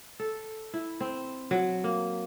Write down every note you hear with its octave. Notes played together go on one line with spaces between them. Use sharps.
A4
E4
C4
F#3
A#3